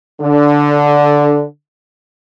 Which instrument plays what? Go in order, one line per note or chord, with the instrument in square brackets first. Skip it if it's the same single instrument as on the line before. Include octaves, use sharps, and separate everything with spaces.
[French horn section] D3